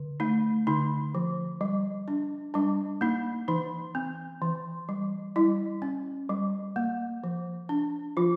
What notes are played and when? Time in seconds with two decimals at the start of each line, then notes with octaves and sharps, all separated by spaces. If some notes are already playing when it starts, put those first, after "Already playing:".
Already playing: D3
0.20 A3 D#4
0.67 D3 D#4
1.15 F3
1.61 G3
2.08 D4
2.54 G3 D4
3.01 A#3 D#4
3.48 E3 D#4
3.95 C4
4.42 E3
4.89 G3
5.36 G3 E4
5.82 C#4
6.29 G3
6.76 A#3
7.24 F3
7.69 D4
8.17 F3 F4